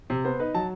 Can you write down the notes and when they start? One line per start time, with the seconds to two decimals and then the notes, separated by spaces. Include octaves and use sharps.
0.10 C3
0.25 B3 C5
0.39 D#4 B4
0.54 F#3 A5